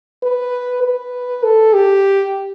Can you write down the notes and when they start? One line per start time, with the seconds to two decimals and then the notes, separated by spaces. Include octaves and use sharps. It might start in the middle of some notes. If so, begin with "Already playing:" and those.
0.23 B4
0.83 B4
1.43 A4
1.74 G4